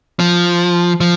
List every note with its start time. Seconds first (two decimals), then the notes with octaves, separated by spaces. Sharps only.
0.19 F3
1.01 F3